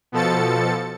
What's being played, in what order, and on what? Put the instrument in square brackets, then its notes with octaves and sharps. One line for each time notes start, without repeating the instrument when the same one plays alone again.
[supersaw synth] B2 F3 A4 A6 C#7